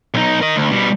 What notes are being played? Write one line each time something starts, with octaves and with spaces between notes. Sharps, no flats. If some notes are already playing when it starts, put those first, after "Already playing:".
B1 D#4
A#4 D#5
D2
B2 G3